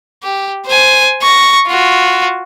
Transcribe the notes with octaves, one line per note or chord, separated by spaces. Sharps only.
G4
C5 G#5
C#6 A#6
F4 F#4